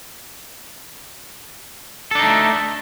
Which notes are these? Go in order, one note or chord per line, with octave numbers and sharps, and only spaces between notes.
A3 D4 D#4 A4